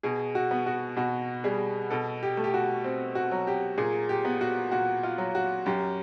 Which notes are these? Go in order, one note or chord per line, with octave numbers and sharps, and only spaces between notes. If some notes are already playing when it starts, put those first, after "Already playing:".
B2 G#4
F#4
B3
F#4
B2 F#4
G3 G#4
B2 A4
G4
A3
G4
F#4
C4
F#4
F#3
G4
A#2 G#4
G4
B3
F#4
A#2 F#4
F4
F#3
F#4
F#2 G4